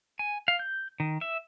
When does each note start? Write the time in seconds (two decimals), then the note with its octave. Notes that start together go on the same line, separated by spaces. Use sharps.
0.19 G#5
0.48 F5
0.59 G6
1.00 D#3
1.21 E5